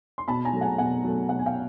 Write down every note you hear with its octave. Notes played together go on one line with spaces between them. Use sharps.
C6
B2 A5 B5
G#5 A#5
F#3 A3
F#5 G#5
B2 F#5 G#5
F#3 A3
B2 F#5
G#5
F5 G5